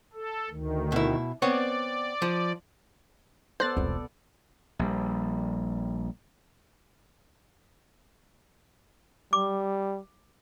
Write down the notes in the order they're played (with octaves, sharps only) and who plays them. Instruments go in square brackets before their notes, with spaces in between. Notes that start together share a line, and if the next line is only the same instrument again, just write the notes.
[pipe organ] A4
D2 D#3
[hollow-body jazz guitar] B2 E4
[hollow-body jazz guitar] B3 C4 C#5 [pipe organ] D5
[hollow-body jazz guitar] F3
[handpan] B3 A4 D5 [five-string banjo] C5 [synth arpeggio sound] F#6 A6
[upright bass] E1 F4 [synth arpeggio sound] C2
[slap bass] A#1 G3
[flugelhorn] G3 [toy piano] D6